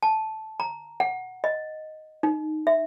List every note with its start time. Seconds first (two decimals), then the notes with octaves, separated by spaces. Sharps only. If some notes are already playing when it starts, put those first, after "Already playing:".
0.03 A5
0.60 A#5
1.00 F#5
1.44 D#5
2.23 D#4
2.67 E5